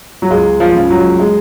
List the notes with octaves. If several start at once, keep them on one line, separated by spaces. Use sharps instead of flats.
F#3
C#2 G#3
F3
C#3 F3
F#3
G#3